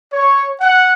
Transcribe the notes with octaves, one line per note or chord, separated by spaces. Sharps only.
C#5
F#5